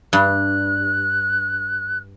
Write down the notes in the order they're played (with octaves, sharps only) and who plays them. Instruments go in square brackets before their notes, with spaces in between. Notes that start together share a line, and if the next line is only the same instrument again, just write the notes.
[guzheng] G2 [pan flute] F#6